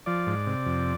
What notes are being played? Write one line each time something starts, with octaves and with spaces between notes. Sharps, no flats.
F3 D5
G#2
C3
F2